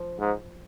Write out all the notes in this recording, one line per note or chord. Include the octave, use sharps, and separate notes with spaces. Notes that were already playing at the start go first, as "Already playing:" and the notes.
Already playing: F3
G#2